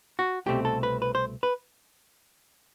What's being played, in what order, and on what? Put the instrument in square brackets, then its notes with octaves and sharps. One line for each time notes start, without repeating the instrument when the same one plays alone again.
[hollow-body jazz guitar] F#4
C2 B2 A3 C4 G4
A4
B4
B4
C5
B4